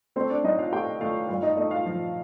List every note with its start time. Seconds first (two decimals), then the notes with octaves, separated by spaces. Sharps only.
0.16 A3 C4 C5
0.30 D4 D5
0.44 A2 D#4 D#5
0.58 F4 F5
0.72 A3 G4 G5
1.01 A3 F4 F5
1.28 G2 F4 F5
1.43 D#4 D#5
1.57 A3 D#4 D#5
1.71 F4 F5
1.86 F3